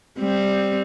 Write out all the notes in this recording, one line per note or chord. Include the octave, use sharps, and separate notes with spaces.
G3 C4